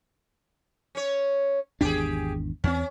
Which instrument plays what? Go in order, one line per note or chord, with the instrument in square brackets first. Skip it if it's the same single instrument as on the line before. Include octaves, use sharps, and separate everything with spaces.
[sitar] C#4 C#5
[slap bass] G#1 E2 D4 [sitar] G4 G#4
[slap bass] E2 C4 [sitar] C#4